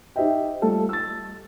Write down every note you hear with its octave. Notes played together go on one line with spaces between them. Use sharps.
D#4 G4 C5 D#5 E5 G5
G3 A3 F4 A4
E6 A6